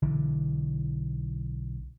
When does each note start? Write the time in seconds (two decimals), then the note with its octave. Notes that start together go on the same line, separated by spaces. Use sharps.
0.02 B1 D3 E3